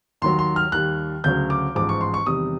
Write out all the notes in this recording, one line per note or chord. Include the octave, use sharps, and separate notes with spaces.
D#2 D#3 F#3 C6
C6
F6
D#2 D#3 G3 F#6
D2 C#3 F#3 G6
D6
A1 G#2 F3 D6
C#6
C6
C#6
E2 C3 D#3 G3 D#6